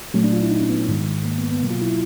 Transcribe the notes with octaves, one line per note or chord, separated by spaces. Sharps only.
A#2 F#3 A3 C#4
D4
F4
E4
D#4
C#4
B3
G#2 D#3 G#3
A#3
B3
B3
B2 F#3 A#3
F4
E4